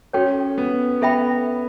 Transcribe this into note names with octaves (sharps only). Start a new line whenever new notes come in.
C#4 F#4 A4 C#5 G5
B3
B3 A4 E5 G5 B5